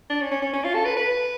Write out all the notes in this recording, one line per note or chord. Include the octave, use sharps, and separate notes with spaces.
D4
C#4
C#4
C#4
C#4
F4
A4
B4
B4